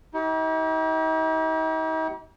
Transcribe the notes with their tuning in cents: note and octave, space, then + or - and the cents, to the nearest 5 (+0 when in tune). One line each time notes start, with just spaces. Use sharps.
D#4 +45 G4 -35